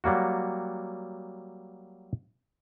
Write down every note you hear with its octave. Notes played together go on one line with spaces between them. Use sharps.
F#3 G3 A#3 F#4